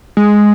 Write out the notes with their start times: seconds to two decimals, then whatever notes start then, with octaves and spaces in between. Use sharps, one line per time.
0.17 G#3